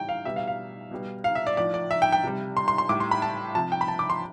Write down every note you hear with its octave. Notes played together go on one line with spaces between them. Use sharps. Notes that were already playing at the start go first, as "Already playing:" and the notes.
Already playing: A2 E3 G3 G5
F5
B2 G3 E5
F5
F5
B2 G3
F5
E5
D5
A2 F3 D5
D5
E5
G5
G5
C3 G3
C6
C6
C6
A2 G3 D6
C6
B5
A5
C3 F3 A5
G5
B5
A5
D6
C6